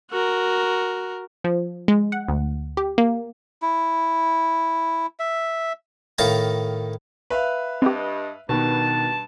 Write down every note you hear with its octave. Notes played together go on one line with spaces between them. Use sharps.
F#4 A#4
F3
G#3
F#5
D2
G4
A#3
E4
E5
A2 D#3 D#4 F5 A5 A#5
B4 E5 F5
G2 C4 G4 D#5
G2 B2 D#3 A5